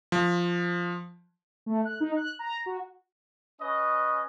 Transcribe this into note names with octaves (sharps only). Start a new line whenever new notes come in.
F3
A3
F#6
D#4
F#6
A#5
F#4
C#4 B4 D#5